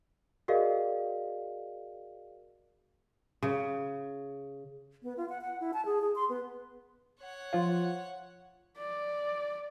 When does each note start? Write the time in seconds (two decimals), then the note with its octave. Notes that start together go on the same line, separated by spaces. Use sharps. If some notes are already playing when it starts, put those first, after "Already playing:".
0.48 F#4 G#4 A#4 D5 D#5 F5
3.43 C#3
5.03 B3
5.17 F4
5.29 F#5
5.41 F#5
5.60 E4
5.74 A5
5.86 G#4
6.01 G#4
6.15 C6
6.29 B3
7.20 C#5 F#5
7.53 F3 F4
8.78 D5